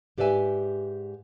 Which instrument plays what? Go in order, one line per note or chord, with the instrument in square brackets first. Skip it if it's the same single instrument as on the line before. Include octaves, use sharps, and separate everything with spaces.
[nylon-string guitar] G#2 G4 B4 D5 E5 G#5